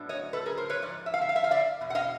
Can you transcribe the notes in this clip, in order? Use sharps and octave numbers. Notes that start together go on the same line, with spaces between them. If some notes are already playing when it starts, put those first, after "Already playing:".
Already playing: A2 F#3 B3 D4
C#5 D#5
A4 B4
G#4 A#4
A#4 C5
B4 C#5
G#2 F3 D5
E5
F5
E5
F5
E5
F5
D5 E5
E2 B2
F#5
D#5 F5